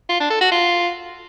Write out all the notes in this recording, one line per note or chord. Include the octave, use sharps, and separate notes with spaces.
F4
D4
A4
F#4
F4